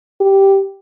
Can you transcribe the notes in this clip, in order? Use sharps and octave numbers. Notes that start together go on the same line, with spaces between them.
G4